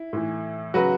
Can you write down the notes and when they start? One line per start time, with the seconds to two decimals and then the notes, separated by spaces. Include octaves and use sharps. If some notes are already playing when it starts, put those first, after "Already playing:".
Already playing: E4
0.13 A2 E3
0.74 C#3 F#3 F#4 B4